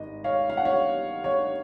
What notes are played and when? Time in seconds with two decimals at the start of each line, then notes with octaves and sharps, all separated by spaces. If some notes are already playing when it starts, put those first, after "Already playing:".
Already playing: G#1 G#2 G#3 D#5
0.24 C#5 F5
0.49 F5
0.57 F#5
0.65 C#5 F5
1.24 C#5